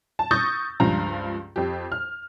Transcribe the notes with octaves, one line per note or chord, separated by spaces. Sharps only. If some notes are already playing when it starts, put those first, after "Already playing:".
A5
C#6 D#6 E6 G6 A6 A#6
C#2 G2 F3 A#5
F2 G4
F6